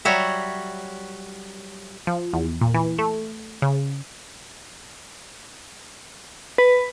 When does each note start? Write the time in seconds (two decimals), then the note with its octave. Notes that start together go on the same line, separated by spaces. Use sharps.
0.05 F#3 G3 F#4 C#5 E5
2.07 F3
2.33 E2
2.61 A#2
2.74 E3
2.99 A3
3.62 C#3
6.58 B4